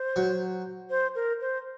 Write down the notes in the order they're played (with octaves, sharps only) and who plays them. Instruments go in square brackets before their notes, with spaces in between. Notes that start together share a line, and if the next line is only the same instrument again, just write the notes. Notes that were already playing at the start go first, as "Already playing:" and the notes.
Already playing: [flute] C5
[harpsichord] F#3
[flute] C5
A#4
C5